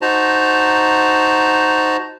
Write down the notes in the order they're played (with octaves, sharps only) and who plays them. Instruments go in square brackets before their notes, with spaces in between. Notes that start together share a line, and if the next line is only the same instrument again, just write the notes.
[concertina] D#4 F#4 C5 A5 A#5